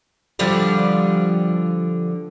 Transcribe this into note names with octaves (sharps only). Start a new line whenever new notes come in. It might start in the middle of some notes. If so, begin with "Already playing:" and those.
D3 F3 G3